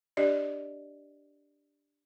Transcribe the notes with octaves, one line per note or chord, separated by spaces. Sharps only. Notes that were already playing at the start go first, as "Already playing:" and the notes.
D4 G4 D5 D#5